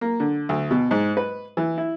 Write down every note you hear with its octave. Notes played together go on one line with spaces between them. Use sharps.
A#3
D3
D2
B2
G#2
B4
E3
E4